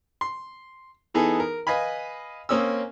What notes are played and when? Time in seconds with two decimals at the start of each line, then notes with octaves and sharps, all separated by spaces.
0.21 C6
1.14 E3 B3 D#4 G#4 A4
1.40 A#4
1.67 B4 D#5 F5 G#5 B5
2.49 A#3 C4 C#4 D#6 E6